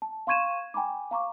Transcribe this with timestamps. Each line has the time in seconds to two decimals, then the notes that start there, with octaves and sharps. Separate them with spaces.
0.02 A5
0.27 F5 C6 C#6 G#6 D#7 E7
0.74 G5 G#5 A#5 B5 D6
1.11 F5 A#5 C#6 D6